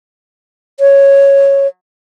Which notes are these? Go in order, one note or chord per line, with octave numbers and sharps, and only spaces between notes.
C#5